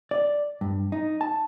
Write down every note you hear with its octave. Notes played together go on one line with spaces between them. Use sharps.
D5
G2
D#4
A5